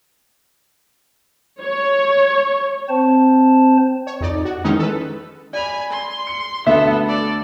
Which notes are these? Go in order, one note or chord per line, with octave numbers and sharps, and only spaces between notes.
C#5
C4 C5 A5
C#5
F2 D#4 D5
F#4
D#3 E3 G#3 C#4 D#4
A4 B4
D5 G#5 B5 F7
C6
C#7
D2 A3 B3 A4 E5 E7
A4 D5